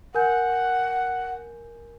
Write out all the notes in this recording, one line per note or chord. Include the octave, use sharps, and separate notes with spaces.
A#4 F#5 G#5 G6